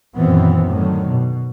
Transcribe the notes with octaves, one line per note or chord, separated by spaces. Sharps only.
F#2 A#2 D#3 E3 B3 C4
A2 D3 D#3 F#3
B2